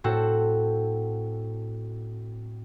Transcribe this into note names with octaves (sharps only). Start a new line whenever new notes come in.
A2 C4 F#4 A4